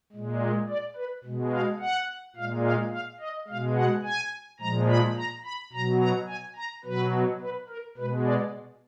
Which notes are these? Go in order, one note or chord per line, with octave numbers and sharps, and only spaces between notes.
A#2 G#3
D5
B4
B2 G#3
F5
F#5
A#2 G#3 F5
F5
F5
D#5
B2 G#3 F5
F#5
G#5
A#2 F3 G#3 A#5
B5
A#5
B5
B2 F#3 A#5
A#5
G#5
A#5
B2 F#3 B4
B4
A#4
B2 G#3 B4
D5